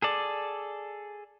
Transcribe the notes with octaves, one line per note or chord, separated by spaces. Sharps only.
G#4 A4 D5